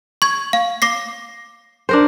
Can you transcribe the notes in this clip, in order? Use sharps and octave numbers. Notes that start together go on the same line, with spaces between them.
C#6 G#6
F5
D6 A#6 C7
D4 A#4 C5